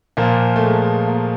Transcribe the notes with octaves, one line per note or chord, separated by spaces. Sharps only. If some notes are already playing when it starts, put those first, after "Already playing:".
A#2 F3 A#3
A3
G#3
A#3